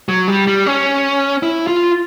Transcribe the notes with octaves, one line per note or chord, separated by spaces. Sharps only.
F#3
G3
G3
C#4
E4
F4